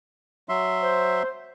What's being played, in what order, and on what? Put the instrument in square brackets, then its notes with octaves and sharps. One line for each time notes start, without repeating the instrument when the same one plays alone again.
[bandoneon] F#3 E5 C6
[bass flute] C5